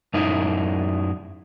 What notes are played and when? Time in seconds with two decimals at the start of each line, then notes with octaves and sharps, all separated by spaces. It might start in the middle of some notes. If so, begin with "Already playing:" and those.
0.14 F#2 D#4 E4